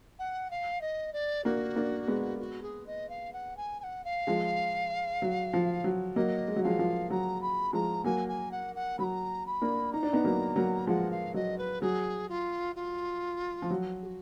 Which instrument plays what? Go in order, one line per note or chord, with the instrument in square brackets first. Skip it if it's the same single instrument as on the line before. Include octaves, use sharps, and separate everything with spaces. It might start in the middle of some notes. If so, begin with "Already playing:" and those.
[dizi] F#5
F5
D#5
D5
[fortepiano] A#3 D4 [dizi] F#4
[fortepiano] A#3 D4
G#3 B3
[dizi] F#4
G#4
D#5
F5
F#5
G#5
G#5
F#5
F5
[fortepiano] F3 G#3
F#3
F3
F#3
[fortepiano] F#3 A#3 [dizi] D#5
[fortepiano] G#3
F#3
[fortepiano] F3 G#3 [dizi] F5
[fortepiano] F3
[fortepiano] F#3 [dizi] A#5
[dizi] B5
[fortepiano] F3 G#3 [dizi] A#5
[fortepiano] F#3 A#3 [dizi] G#5
[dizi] G#5
F#5
F#5
[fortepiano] F#3 [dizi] B5
[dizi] A#5
B5
[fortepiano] A#3 D4
[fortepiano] D#4 [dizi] A#5
[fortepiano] D4
B3 D#4
F#3 A#3
F#3 A#3
[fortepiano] F3 G#3 [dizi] F#5
[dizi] F5
[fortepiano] F#3 [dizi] D#5
[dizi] B4
[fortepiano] F#3 [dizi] G#4
[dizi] F4
F4
[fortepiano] F3
F#3
[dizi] G#4
F#4